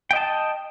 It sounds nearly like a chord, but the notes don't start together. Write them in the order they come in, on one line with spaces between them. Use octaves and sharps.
G5 D#5 A5